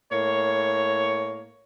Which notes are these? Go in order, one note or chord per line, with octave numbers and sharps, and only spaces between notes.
A2 A#3 C#5